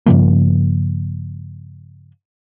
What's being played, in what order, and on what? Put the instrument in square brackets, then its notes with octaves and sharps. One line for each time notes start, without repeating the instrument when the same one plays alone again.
[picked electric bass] G2 C#3 F3 A#3